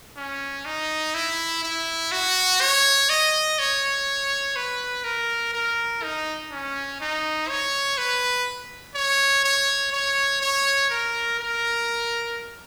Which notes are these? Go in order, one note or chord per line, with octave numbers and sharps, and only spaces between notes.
C#4
D#4
E4
E4
F#4
C#5
D#5
C#5
B4
A#4
A#4
D#4
C#4
D#4
C#5
B4
C#5
C#5
C#5
C#5
A#4
A#4